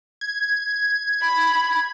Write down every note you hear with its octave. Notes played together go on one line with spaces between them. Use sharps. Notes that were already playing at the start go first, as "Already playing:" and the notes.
G#6
B5